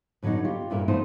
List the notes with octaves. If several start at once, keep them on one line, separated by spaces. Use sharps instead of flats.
A2 D3 F#3 B3 D#4
F4 G4
G2 A#2 E4 A#4
E3 A3 B3 D#4 F4 C5